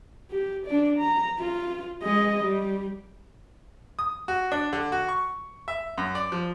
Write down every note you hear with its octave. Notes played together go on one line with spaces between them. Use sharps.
G4
D4 D5
A#5
F4
G#3 D#5
G3
D#6
F#4
D4
D3
F#4
C#6
E5
F#2
D5
F3